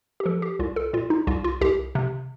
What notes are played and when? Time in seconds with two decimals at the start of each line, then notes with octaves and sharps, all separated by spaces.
0.20 G4
0.26 F3 A4
0.42 G4
0.59 C2 F4
0.76 A4
0.93 A#2 F4
1.10 D#4
1.27 C2 F4
1.44 F4
1.61 C2 G4
1.95 C3